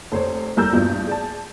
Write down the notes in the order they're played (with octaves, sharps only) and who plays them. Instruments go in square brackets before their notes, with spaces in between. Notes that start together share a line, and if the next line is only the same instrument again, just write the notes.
[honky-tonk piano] F1 C5 C#5
F1 G3 A#4 A#5 E6 G6
E2 G2 B2 F3
G#4 D5 A5